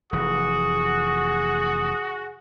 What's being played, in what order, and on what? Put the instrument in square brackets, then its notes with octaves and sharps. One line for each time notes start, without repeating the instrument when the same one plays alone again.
[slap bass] F1 E3 [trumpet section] F#4 [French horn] G#4 [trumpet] D#6